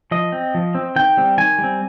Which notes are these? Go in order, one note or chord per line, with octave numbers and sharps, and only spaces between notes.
F3 D#5
C4
F3
C4
D#3 G5
G3 C4
D#3 G#5
G3
C4